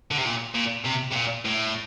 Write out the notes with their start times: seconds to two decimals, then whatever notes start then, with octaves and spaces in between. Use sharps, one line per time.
0.11 D3
0.18 C3
0.25 A#2
0.55 A#2
0.85 C3
1.11 C3
1.15 A#2
1.45 A2